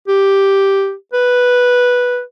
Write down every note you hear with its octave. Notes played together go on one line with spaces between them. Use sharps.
G4
B4